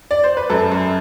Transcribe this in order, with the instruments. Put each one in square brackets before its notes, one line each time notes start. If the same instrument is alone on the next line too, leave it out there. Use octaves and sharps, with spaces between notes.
[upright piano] D5
C5
B4
F#2 A4
F#2